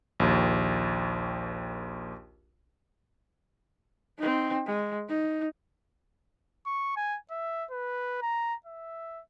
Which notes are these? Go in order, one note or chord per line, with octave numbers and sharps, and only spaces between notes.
A#1 D#2
C4 D#4
G#3
D#4
C#6
G#5
E5
B4
A#5
E5